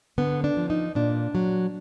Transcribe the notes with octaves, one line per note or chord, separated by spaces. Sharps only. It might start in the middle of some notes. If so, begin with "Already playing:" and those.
D3 B3
D4
F3
D#4
A#2 D4
F#3